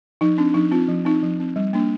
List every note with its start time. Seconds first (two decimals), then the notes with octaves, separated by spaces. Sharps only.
0.21 F3 D#4
0.38 C4 D4
0.54 F3 D#4
0.72 C4 F4
0.88 F3
1.05 C4 D#4
1.23 F3
1.40 C4
1.56 G3
1.73 A#3 D4